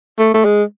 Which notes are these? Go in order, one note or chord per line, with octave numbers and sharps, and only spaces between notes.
A3
A3
G#3